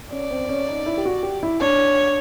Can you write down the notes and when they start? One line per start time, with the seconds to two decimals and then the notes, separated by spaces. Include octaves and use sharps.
0.12 C#4 D5
0.31 C4
0.49 C#4
0.68 D#4
0.86 E4
0.98 G4
1.05 F#4
1.23 G4
1.43 E4
1.61 D4 C#5